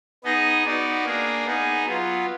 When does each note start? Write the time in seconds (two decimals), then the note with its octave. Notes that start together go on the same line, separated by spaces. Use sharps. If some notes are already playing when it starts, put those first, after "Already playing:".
0.24 B3 D#4 G#4 D#5
0.65 B3 D#4 F#4 D5
1.05 A#3 D4 G#4
1.46 B3 D#4 G#4
1.85 F#3 B3 F4